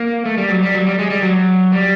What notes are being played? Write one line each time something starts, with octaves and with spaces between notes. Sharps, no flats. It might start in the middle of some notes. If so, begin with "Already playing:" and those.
Already playing: A#3
A3
G3
F#3
G3
F#3
G3
G#3
G3
F#3
G3